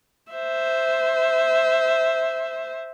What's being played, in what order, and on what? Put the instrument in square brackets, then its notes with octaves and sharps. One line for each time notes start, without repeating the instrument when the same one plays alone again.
[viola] C5 E5